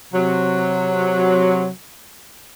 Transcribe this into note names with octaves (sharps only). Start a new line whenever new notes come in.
C3 F#3